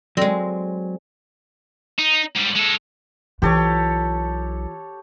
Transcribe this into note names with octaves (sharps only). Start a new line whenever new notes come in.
F#3 G#3 C4 A4 D5 A#6
D#4
G#2 G3
G#3 A4
B1 E3 F4 G4 A4 C#5